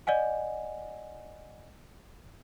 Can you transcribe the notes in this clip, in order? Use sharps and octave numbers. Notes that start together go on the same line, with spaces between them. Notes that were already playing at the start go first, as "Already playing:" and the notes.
D5 D#5 F#5 G#5